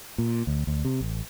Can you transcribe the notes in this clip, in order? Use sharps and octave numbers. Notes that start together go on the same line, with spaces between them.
A#2
D2
D2
C3
A1